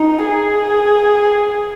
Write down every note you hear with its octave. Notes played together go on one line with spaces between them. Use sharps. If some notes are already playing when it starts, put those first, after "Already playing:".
Already playing: D#4
G#4